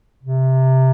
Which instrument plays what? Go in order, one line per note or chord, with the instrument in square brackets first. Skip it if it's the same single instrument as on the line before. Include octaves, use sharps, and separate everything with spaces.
[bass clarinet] C3